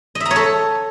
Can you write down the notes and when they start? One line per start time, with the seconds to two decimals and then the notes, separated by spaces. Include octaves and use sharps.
0.15 D#5
0.20 E5
0.25 A#5
0.31 C#5
0.36 A4